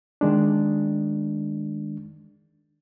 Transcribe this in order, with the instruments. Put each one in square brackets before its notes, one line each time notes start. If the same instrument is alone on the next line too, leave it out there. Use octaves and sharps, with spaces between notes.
[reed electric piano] D#3 G#3 D4